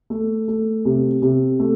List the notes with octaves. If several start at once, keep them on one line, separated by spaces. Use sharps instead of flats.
A3
A3
C3
C3
A3